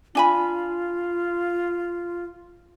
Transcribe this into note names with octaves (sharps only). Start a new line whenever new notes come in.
D4 F4 G#5 B5